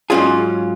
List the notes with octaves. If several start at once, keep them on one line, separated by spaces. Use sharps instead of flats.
G#2 F#3 C#4 F4 G#4